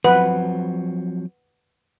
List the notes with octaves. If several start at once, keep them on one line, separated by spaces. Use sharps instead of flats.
F3 F#3 C4 B4 F#5